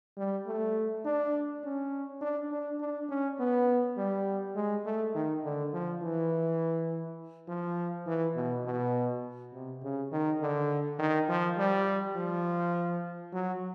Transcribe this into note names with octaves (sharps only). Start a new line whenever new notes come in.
G3
A3
D4
C#4
D4
D4
D4
C#4
B3
G3
G#3
A3
D#3
D3
F3
E3
F3
E3
B2
B2
C3
C#3
D#3
D3
D#3
F3
G3
F3
F#3